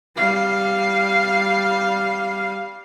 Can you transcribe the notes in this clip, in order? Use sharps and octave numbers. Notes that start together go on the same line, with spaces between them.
G3 F5